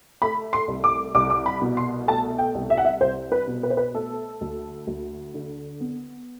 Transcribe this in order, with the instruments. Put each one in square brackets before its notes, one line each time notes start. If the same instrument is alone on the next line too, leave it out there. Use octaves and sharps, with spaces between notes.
[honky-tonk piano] A3 B5
C6
C2
D6
C2 D6
D6
B5
B2
C6
A3 A5
G5
C2
E5
F#5
E5
C2 C5
B4
B2
B4
C5
B4
A3 A4
D2
D2
D3
B3